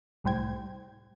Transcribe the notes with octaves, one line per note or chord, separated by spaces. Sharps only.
C2 A2 G3 C5 G5 G#6